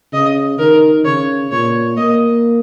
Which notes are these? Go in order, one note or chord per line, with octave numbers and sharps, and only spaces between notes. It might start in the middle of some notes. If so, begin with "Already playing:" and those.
C#3 D#5
D#3 A#4
C#3 C#5
A#2 C#5
A#3 D#5